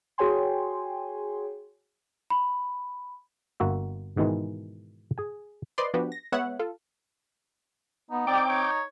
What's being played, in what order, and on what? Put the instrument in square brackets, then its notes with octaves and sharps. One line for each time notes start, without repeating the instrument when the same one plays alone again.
[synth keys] F#4 G#4 C#5 G5 G#5 C6
[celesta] B5
[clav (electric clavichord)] G1 A#3 F#4 E5
G#2 B2 D#3 E3 G#3
G#4 G#5
[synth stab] B4 C5 D5 D#5 C6
F3 B3 D4 F#4 G4 B4
A#6
G#3 B3 C#5 E5 F#5
F4 A4
[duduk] B3 [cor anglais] D#4
[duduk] C4 [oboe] D5 [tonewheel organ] G5 D6
[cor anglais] D#4 [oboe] C#5